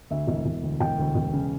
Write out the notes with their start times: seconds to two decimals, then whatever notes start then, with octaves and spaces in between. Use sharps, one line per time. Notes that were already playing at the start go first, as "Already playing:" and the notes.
0.10 D2 E5
0.27 E1
0.46 E1
0.62 D2
0.80 E1 G5
0.98 D2
1.15 E1
1.33 C#3